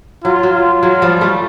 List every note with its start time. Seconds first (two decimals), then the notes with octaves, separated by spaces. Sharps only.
0.24 F#3 F4
0.43 F#3
0.54 F4
0.83 F#3 G#3
1.02 F3 G3
1.21 G3 A3